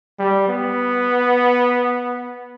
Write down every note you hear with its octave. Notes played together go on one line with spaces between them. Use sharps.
G3
B3